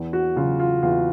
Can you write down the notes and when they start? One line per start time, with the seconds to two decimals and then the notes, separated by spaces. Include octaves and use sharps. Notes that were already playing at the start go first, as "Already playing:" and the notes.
Already playing: E2
0.13 F#4
0.36 C#3 F#3 F4
0.59 F4
0.83 E2 F4